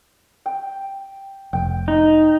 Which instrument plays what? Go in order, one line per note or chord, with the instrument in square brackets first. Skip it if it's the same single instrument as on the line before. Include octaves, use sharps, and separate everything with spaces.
[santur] G5
[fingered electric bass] F1 [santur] G5
[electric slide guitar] D#4